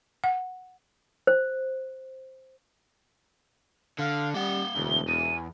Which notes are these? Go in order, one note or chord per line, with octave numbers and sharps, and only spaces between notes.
F#5
C5
D3 F5
G3 A#3 F#5 G7
E1 D2
E2 D#7